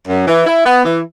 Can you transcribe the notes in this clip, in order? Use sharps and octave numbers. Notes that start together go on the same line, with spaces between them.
F#2
E3
E4
B3
E3